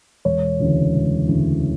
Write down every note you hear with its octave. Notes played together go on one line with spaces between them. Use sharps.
E1 C#5
D2 C#3 E3
E1
D2 C#3 E3